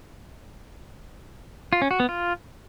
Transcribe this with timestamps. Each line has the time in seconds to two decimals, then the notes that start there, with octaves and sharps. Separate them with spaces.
1.73 F4
1.82 C#4
1.91 F#4
2.00 B3
2.09 F4